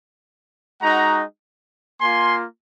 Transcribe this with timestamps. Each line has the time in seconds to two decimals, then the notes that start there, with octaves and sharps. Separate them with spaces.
0.80 G#3 D#4 F#4 F#5 A#5
2.01 A#3 F4 G#5 C6